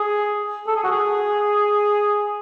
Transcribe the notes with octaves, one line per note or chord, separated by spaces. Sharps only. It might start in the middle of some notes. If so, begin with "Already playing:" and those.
Already playing: G#4
A4
G#4
F#4
G#4